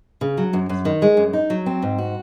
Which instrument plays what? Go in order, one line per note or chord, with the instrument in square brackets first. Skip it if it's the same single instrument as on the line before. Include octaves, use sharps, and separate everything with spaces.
[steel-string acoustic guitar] C#3
F#3
F#2
F#2
D#3
G#3
F#2
D#4
F#3
C4
G#2
F#4